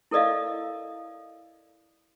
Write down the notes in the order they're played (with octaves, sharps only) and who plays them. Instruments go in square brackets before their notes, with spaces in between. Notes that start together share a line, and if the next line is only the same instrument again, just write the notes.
[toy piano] E4 A4 A#4 D5 D#5 F5